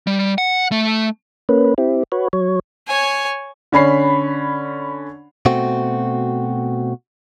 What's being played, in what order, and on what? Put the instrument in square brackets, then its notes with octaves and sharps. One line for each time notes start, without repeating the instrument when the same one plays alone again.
[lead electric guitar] G3
F#5
A3
[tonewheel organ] A#3 C#4 B4
C4 E4 G4
F#4 B4 C#5
F#3 C#5
[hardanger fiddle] C#5 G#5
[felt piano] D3 C#4 B5 C7
[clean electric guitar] B2 A3 C4 F#4